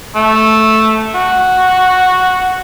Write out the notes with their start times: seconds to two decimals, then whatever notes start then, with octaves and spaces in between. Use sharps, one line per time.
0.16 A3
1.15 F#4